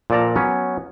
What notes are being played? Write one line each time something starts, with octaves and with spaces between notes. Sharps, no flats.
A#2 F3 A4 D5 A5 A#5
F#3 B3 C#4